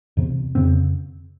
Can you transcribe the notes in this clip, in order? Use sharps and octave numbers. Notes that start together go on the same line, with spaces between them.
E2 C3
F2 C#3 C4